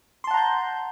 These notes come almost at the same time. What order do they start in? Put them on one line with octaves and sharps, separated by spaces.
C6 A5 F#5 A#5 G6